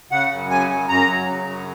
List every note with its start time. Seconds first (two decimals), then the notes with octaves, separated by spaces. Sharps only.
0.11 C#3 F#5
0.31 F#2
0.50 C#3 G#5
0.70 F#2
0.89 F#2 A#5
1.08 F#3
1.28 C#3
1.48 F#2